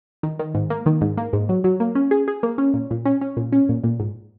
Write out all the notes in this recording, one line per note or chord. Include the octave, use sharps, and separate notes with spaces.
D#3
D#3
G#2
A#3
D#3
G#2
A#3
G#2
F#3
F#3
A#3
C#4
G#4
G#4
A#3
C#4
A#2
A#2
C#4
C#4
A#2
C#4
A#2
A#2
G#2